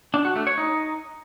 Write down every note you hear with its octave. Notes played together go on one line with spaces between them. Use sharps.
D4
F#4
A3
C#5
D#4